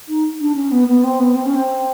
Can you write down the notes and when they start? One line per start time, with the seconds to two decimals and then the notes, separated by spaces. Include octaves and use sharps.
0.09 D#4
0.41 D4
0.56 C#4
0.71 B3
0.88 B3
1.04 C4
1.20 B3
1.35 C4
1.46 C#4
1.55 C4